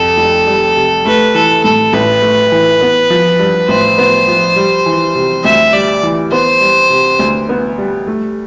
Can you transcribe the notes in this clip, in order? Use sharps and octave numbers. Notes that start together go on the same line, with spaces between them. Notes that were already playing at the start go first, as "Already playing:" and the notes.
Already playing: F2 C3 A4
F1
G3
C3
A3 B4
E3 A4
A2 A4
A1 B4
A3
E3
B3
F3
G2
A1 C5
B3
F3
G3
E3
C3
D2 E5
G3 D5
E3
B3 C5
G3
C3
D2
B3
G3
A3